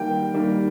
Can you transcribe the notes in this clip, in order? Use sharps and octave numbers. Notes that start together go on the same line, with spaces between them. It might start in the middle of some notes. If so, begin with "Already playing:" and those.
Already playing: D#3 G3 A#3 G5
D#3 G3 A#3